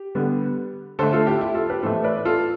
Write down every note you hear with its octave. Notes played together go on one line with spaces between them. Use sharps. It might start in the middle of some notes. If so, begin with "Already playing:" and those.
Already playing: G4
D3 G3 B3
D3 A3 A4 C5
F4 A4
E4 G4
E4
F4 A4
G4 B4
A2 E3 A3 A4 C5
B4 D5
F4 A4